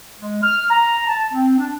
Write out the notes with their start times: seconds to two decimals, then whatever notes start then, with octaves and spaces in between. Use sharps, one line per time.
0.20 G#3
0.43 F6
0.70 A#5
1.07 A5
1.33 C4
1.58 D4